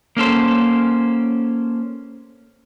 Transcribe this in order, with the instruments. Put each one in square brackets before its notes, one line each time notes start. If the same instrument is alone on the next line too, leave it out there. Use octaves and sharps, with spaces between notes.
[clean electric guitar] A#3 C#4 A4 C5